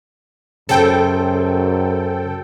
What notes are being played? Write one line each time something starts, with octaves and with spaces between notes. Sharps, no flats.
F#2 C#3 G#4 A4 C5 G5